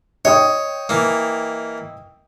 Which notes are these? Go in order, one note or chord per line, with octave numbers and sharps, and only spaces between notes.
C#5 D#5 G5 D#6
E3 A#3